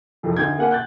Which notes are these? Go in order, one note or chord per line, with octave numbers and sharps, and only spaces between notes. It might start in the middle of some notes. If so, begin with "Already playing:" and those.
C2 F2 A4
D2 D#4 G6 G#6
A#3 F#5 G#5
F#6 G6 A6